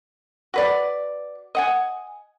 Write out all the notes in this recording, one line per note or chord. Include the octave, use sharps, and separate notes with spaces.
F#4 B4 D5
D#5 F#5 G#5